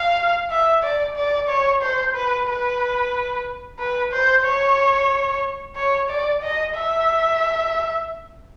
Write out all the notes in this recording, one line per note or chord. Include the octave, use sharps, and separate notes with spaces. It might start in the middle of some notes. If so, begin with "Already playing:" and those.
Already playing: F5
E5
D5
D5
C#5
C5
B4
B4
B4
C5
C#5
C#5
D5
D#5
E5